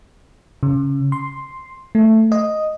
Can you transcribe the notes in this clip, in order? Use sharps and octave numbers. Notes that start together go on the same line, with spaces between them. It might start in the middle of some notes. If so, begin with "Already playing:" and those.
C#3
C6
A3
D#5